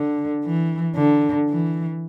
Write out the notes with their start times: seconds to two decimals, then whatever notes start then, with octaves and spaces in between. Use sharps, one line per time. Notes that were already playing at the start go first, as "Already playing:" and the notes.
Already playing: D3
0.45 E3
0.96 D3
1.49 E3